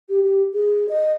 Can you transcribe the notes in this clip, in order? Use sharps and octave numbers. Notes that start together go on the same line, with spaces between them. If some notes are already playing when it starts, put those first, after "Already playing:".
G4
G4
G#4
D#5